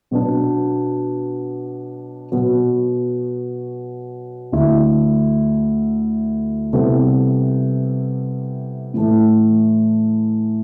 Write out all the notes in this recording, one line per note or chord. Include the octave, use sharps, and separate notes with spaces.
B2 F#3 B3 D4
B2 F#3 B3
D2 D3 A3 E4
C3 G3 B3 E4 A4
A2 E3 A3